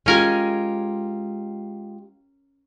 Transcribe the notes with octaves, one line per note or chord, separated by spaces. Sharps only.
G#3 C#4 F4 G4 A#4 G#5